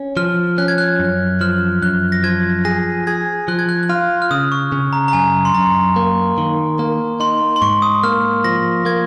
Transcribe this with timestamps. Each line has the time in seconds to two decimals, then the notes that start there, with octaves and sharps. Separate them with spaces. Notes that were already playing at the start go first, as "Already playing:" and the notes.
Already playing: C#4
0.17 F3 F6
0.58 C#4 F#6
0.68 G#6
0.78 F#6
1.00 F#2
1.41 F3 F6
1.82 F#2 F#6
2.12 A#6
2.24 F3 G#6
2.65 G#4 A#6
3.07 G#4 G#6
3.48 F3 F#6
3.59 G#6
3.69 F#6
3.83 F#6
3.89 F4 F6
4.22 F6
4.31 C#3 D#6
4.52 C#6
4.72 C#3
4.93 A#5
5.08 A#5
5.13 F#2 G#5
5.45 C6
5.54 F#2 A#5
5.96 A#3
6.38 D#3
6.79 A#3
7.20 D#4 C6
7.56 C6
7.62 G#2 C#6
7.82 D#6
8.03 A#3 F6
8.44 F3 A#6
8.85 A#3 G#6